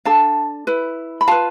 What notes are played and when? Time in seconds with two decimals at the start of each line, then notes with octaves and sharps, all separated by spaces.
0.05 D4 A4 F5 A5
0.67 E4 B4
1.21 B5
1.28 F4 B4 F5 A5